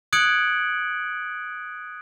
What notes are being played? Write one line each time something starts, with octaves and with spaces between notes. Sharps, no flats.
D#6 F#6 G#6 C#7 D7 F#7